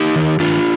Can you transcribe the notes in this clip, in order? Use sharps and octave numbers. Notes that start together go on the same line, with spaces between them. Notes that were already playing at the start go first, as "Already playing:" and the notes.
Already playing: D#4 G4
D#3
D#3 D4 F4